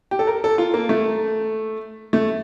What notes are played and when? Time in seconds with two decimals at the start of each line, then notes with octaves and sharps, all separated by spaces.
0.11 G4
0.19 A4
0.27 A#4
0.44 A4
0.58 F4
0.74 A#3
0.89 A3
2.13 A3